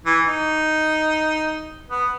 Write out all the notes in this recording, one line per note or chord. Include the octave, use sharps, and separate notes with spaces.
E3
D#4
B3